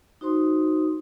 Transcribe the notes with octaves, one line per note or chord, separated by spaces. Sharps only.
D#4 F#4 C5 C6 D#6